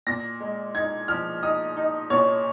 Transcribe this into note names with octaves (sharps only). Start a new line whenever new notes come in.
A#2 A#6
G#3
D#4 G#6
F3 F6
D#4 D#6
D#4
A#2 C#5